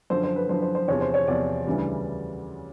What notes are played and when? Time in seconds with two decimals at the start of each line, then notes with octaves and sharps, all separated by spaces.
0.10 F#2 D3 F3 C5
0.23 C5
0.36 B4
0.49 F#2 D3 F3 C5
0.62 C5
0.75 C5
0.88 E2 C3 F3 C#5
1.01 C5
1.14 C#5
1.27 E2 C3 F3 D5
1.67 D2 C#3 E3 G3